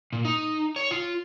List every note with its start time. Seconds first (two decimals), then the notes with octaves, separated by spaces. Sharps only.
0.13 A#2
0.25 D#4
0.76 C#5
0.91 F4